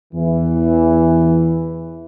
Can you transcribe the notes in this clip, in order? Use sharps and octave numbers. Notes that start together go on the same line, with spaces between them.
E2 E3